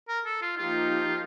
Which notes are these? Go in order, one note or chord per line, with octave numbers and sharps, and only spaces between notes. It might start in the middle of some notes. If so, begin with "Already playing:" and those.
A#4
A4
F4
F3 A#3 D#4 F4 G4